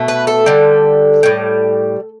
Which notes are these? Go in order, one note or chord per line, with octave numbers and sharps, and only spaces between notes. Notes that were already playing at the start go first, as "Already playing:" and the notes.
Already playing: B2 A3
B4
A4
D3 G3
A2 G3